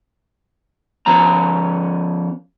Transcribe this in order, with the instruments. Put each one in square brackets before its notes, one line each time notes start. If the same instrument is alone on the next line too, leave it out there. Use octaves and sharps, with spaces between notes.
[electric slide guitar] F3 B3 C#4 A#5